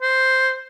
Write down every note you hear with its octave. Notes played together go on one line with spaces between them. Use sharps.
C5